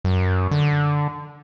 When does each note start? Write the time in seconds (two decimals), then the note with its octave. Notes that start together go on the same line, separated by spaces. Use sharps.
0.04 F#2
0.51 D3